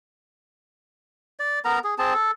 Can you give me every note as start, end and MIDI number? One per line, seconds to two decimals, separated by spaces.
1.39 1.59 74
1.65 1.79 59
1.65 1.79 70
1.65 1.79 82
1.84 1.94 68
1.98 2.14 60
1.98 2.14 68
1.98 2.14 81
2.14 2.31 69